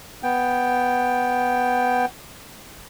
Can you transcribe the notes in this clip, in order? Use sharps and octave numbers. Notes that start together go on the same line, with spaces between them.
B3 G5